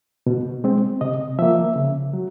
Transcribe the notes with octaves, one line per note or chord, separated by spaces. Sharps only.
B2
G#3 C4
C3 D#5
F3 A#3 E5
C#3
F#3